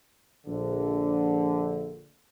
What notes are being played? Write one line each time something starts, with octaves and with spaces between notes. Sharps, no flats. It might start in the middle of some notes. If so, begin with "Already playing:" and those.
A#1 D3